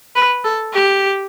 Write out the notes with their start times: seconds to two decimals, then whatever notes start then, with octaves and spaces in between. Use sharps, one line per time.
0.16 B4
0.44 A4
0.74 G4